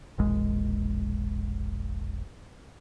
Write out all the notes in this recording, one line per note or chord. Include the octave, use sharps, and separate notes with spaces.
E1 A#1 G#3